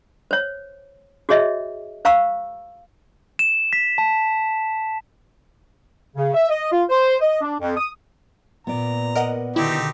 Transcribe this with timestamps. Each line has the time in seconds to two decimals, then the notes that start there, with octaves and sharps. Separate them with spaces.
0.31 C5 C#5
1.29 F#4 G#4 C#5 D#5 E5
2.05 C5 F5 A#5 C#6 E6
3.39 E7
3.73 B6
3.98 A5
6.16 C#3
6.34 E5
6.49 D#5
6.72 F4
6.89 C5
7.20 D#5
7.41 D4
7.60 F2
7.77 D#6
8.67 A#2 B3 D5 A#5
9.15 A#4 D#5 F#5
9.56 B2 D3 D#3 C4 D#4 E4 G4